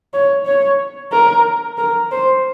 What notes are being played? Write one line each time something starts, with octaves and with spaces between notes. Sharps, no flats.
C#5
C#5
A#4
A#4
C5